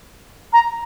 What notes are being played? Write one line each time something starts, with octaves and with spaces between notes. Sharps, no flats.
A#5